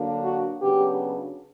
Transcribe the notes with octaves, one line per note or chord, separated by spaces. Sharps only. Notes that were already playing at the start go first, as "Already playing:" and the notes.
Already playing: D3 F#3 A#3 D4
F#4
C#3 F#3 B3 D4 G4